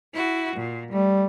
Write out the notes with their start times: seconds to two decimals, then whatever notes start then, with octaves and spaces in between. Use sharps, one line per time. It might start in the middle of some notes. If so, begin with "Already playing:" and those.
0.13 E4 F#4
0.55 A#2
0.91 G3 A3